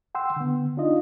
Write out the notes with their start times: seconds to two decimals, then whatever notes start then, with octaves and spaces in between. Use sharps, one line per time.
0.15 F#5 G5 C6 E6
0.36 D3 B3
0.77 D4 D#4 F4 D#5